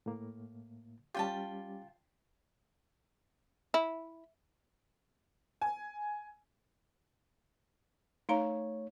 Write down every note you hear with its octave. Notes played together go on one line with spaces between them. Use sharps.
A2 A#3
G3 C#4 F4 G4 G5 A5
E4
G#5
A3 D#4 C#5 F5 A#5